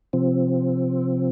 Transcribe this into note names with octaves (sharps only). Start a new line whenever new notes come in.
C3 F3 C4